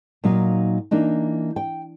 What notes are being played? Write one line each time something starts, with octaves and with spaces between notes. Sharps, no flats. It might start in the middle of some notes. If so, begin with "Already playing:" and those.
A#2 F#3 D#4 F5
E3 A#3 D4 D#4
G5